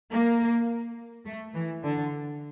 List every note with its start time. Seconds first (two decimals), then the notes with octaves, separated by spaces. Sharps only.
0.11 A#3
1.25 A3
1.54 E3
1.83 D3